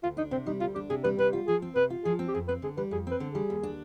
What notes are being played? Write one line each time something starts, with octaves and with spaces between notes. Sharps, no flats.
D2 F4
D4 D#4
C3 C4
G3 D#4
D2 F4
D4 G4
C3 G#4
G3 B4
C3 B4
F4
F3 G#4
C4
C3 B4
F4
F3 G#4
C4
G4
F2 G#4
C4 B4
D3 G#4
G3 B4
F2 G#4
C4 B4
D3
G#4
G3
D#2
D4